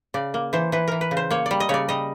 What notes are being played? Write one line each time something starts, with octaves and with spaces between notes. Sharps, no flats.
C#3 D5
A#3
E3 C5
E3 B4
E3 A#4
B4
C#3
C5
A#3 C#5
G3 D5
D#5
C#3 C#5 D5
G3 D#5